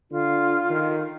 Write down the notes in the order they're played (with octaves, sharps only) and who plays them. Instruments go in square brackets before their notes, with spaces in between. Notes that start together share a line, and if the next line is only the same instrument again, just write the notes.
[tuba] D3 [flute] F4
[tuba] D#3